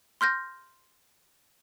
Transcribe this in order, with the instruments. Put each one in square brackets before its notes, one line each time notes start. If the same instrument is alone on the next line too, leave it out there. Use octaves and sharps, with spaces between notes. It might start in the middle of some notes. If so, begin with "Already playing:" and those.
[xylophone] C6 F6 G6 A#6